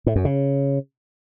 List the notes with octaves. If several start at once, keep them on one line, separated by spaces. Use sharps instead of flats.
A2
F#2
C#3